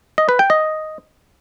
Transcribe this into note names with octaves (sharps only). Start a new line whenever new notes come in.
D#5
B4
G5
D#5